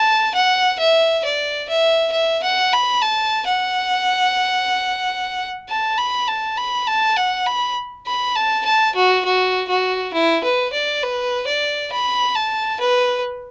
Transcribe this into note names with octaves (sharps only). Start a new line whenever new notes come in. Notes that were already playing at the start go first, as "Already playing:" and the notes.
Already playing: A5
F#5
E5
D5
E5
E5
F#5
B5
A5
F#5
A5
B5
A5
B5
A5
F#5
B5
B5
A5
A5
F#4
F#4
F#4
E4
B4
D5
B4
D5
B5
A5
B4